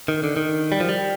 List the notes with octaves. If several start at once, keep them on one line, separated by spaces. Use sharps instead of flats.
D#3
D3
D#3
G3
F3
G3